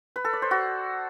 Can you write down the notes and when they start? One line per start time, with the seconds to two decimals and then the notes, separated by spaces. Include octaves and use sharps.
0.16 B4
0.25 A4
0.33 D5
0.42 C5
0.51 F#4